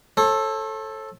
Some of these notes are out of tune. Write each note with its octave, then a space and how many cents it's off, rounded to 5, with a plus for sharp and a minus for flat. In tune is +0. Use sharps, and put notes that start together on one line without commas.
A4 +0 C#5 -45